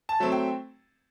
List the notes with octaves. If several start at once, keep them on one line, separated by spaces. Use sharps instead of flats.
A5
F#3 A3 C4
G5